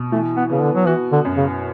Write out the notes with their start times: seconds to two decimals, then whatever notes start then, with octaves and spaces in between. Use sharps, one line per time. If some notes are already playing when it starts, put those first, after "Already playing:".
Already playing: B2
0.12 E3 A3
0.36 B3
0.50 C#3 B3
0.62 D3
0.75 F#3
0.87 E3 F#4
1.12 D3
1.25 F#2
1.37 C#3